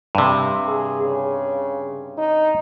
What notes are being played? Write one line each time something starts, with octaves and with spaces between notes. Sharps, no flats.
G2 C3
G#4
C#3
D#4